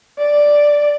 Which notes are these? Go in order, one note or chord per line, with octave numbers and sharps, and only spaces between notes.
D5